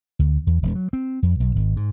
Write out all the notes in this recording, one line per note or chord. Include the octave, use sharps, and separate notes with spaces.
D2
E2
E1
F#3
C4
F2
B1
G#1
G#2